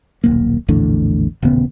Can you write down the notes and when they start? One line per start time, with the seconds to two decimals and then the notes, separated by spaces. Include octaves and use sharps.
0.24 D#1 B1 A#3
0.68 A#1 E2 A2 D3
1.42 D#1 A1 C#3 B3